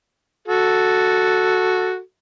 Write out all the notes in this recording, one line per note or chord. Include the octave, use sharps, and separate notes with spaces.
F#4 A4